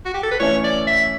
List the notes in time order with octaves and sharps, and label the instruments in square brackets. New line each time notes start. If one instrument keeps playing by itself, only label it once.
[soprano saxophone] F#4
G4
A4
B4
[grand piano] E3 A3 C#4 [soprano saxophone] C#5
[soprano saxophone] D5
E5